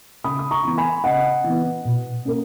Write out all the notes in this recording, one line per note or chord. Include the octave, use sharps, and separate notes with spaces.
C#3 B5 D#6
D#6
A#5 C#6
E3 B3
G#5 B5
C#3 D#5 F#5
E3
B3
B2
A#3 C#4